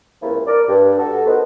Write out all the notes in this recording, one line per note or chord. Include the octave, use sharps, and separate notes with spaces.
C#2 C3 F3 A#3 E4
A#4 D5
G2
F#4 A4
B3 D#4 F#4 A#4 C5